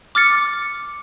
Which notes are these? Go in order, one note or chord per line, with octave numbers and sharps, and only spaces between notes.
D6 F6 A6 C#7